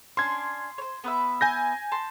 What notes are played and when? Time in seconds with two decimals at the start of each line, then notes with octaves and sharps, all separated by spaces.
0.17 C#4 D4 C6 G#6
0.78 C5 C#5
1.04 B3 B4 E5
1.41 G#5 G6 A#6
1.92 A5 C6